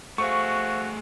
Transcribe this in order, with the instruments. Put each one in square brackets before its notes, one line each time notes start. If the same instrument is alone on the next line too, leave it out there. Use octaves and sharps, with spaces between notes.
[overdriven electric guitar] A3 G#4 [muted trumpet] F#4 [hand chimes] A4 C5 F5 [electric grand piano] C#6